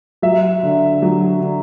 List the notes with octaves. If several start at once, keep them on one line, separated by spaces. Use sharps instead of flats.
F#3 E5
D3
F#3
D3